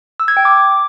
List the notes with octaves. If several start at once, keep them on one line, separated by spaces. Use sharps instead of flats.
E6
G#6
G5
D6